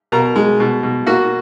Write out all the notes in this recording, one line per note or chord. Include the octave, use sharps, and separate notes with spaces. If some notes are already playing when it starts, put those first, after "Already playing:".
B2 A#4 A#5
G#3
B2
B2
A#3 F#4 F#5